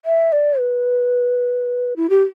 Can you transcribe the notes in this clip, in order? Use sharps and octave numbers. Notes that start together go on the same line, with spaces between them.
E5
D5
B4
E4
G4